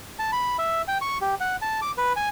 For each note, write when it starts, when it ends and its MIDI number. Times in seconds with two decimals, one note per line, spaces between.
0.19 0.31 81
0.32 0.57 83
0.59 0.82 76
0.88 0.98 79
1.01 1.18 85
1.21 1.35 67
1.40 1.56 78
1.62 1.80 81
1.82 1.91 86
1.98 2.13 71
2.16 2.29 80